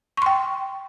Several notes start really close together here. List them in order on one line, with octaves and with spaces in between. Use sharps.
C#6 C6 G5